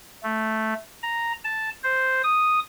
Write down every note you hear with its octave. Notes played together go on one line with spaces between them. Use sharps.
A3
A#5
A5
C5
D#6